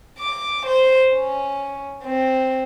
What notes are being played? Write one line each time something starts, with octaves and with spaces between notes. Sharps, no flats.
D6
C5
C#4
C4